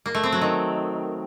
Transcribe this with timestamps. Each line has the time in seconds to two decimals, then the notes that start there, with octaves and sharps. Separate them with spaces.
0.06 A#3
0.15 A3
0.24 C4
0.32 F#3
0.41 D#3